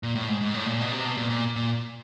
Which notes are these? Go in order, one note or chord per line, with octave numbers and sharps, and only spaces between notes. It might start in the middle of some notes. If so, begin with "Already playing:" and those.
A#2
A2
G#2
G#2
A2
A#2
B2
C3
B2
A#2
A#2
A#2